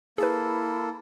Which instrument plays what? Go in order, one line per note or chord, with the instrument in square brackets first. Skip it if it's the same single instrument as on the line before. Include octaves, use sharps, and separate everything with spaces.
[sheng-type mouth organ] A#3 A4 [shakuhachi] E4 [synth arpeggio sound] G#4 B4